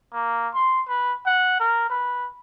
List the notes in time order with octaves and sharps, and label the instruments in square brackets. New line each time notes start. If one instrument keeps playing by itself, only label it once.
[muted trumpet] A#3
C6
B4
F#5
A#4
B4